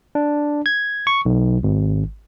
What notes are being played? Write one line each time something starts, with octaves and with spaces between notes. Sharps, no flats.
D4
G#6
C#6
B1
G#1